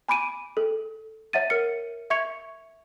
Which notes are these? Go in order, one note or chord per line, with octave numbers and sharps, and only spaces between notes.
G#5 B5 D6 D7 D#7
A4
C#5 E5 F#5 A6 D#7
A#4 F6 C#7
E5 C#6 G#6 C#7 F7